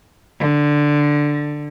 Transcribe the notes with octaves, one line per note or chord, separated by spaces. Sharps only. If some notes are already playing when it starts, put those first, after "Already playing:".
D3